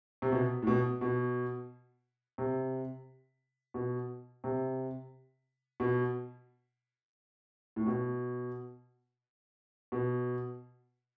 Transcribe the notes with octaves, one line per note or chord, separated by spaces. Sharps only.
C3
B2
A2
B2
B2
C3
B2
C3
B2
A2
B2
B2